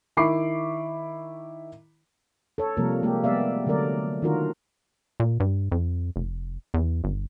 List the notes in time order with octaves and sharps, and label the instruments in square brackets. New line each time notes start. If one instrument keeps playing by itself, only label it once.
[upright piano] D#3 E4 B5 C#6 D6 C7
[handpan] A4 C#5
C3 F3 G3 A#3 A#4
G#3 A#3 G4
G3 A3 B3 D5 E5 F5
D3 F#3 A3 A#4 D5
D#3 D4 F4 F#4 A#4
[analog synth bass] A#2
G2
F2
F1
E2
G1